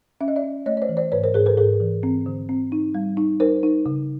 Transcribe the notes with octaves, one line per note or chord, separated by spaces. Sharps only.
C#4 E5
D#5
D5 E5
C#4
A3 C#5 D#5
C#5
C5 D5
E3
C5 D5
G#2 B4 C#5
A#4 C5
G#2 G#4 A#4
A4 B4
G#2 G#4 A#4
E3
C4
D3
C4
D#4
G3
D#4
D#4 A#4 C5
D#4
C#3